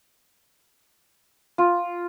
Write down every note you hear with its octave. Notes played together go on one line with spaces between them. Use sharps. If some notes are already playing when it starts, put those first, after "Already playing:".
F4